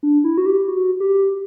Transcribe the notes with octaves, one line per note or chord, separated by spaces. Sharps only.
D4
E4
F#4
G4
F#4
G4